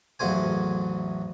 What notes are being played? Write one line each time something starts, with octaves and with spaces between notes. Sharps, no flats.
A1 E2 F#3 C5 G#5